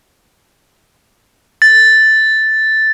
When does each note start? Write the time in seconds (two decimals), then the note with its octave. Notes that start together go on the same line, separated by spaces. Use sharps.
1.62 A6